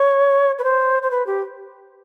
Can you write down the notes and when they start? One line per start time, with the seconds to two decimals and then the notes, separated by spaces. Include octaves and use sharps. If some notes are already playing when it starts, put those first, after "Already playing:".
Already playing: C#5
0.59 B4
0.64 C5
1.03 C5
1.11 B4
1.27 G4